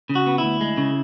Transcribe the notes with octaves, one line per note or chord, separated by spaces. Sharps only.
C#3
F#4
B3
E4
D2
G#3
C#3